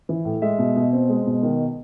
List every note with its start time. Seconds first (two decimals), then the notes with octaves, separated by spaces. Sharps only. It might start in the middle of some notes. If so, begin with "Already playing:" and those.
0.09 E3
0.25 A2
0.42 G#3 E5
0.59 B2
0.76 B2
0.93 C4
1.09 G#3
1.27 B2
1.43 D#3